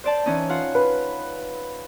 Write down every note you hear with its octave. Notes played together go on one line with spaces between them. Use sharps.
C5 D5 A5
E3 C#4 D#4
F4 F5 F#5
B4